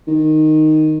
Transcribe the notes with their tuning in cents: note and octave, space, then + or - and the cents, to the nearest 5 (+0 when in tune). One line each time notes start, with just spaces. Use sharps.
D#3 -5